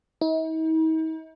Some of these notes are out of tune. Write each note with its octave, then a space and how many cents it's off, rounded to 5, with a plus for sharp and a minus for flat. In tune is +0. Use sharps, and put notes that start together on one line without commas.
D#4 +45